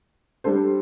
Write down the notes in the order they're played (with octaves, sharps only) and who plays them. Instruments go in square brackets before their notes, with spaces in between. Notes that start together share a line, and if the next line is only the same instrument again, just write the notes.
[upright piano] G3 D4 A4 C5